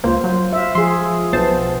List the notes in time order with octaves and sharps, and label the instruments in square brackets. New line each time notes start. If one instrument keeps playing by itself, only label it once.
[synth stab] C#2 A#3 [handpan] F4 C5
[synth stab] F#3
[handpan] E5 F5
[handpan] F3 G#4 [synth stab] C6
[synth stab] B1 C5 A5 [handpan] B3